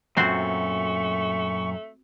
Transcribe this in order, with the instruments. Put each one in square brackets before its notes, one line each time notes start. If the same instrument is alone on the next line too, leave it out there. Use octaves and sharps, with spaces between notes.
[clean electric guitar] F#2 A#2 [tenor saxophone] A3 [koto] C4 F#4 C5 [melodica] C#6